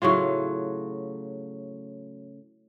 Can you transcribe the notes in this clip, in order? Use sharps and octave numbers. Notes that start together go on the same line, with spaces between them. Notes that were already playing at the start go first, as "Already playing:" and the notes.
A2 C#3 F#3 F4